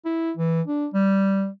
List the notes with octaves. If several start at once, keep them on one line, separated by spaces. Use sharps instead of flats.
E4
E3
D4
G3